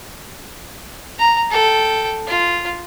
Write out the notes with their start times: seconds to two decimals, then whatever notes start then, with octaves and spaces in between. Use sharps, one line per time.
1.19 A#5
1.51 A4 G5
2.27 F4